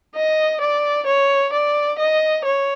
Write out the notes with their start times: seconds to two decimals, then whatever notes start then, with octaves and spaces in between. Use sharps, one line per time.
0.16 D#5
0.61 D5
1.06 C#5
1.53 D5
1.99 D#5
2.45 C#5